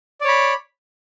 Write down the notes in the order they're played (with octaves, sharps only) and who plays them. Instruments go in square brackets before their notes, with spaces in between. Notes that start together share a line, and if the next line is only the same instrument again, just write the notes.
[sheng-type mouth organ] D5
C#5
B5